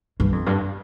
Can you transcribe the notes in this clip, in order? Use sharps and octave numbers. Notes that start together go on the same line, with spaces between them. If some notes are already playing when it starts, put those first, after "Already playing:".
G2
F2
G2